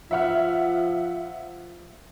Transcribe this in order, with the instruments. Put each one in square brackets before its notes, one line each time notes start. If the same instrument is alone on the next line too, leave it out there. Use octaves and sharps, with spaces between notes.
[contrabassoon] F3 [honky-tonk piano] E5 F#5 F6